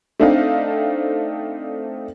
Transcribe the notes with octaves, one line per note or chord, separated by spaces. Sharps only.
A3 C4 D4 D#4 F5